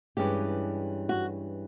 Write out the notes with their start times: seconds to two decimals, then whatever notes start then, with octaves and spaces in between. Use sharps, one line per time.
0.17 G2 E3 G#3 C#4 G4
1.09 F#4